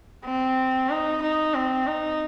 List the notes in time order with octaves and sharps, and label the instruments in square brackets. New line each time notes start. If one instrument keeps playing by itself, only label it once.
[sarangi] C4
D#4
D#4
C4
D#4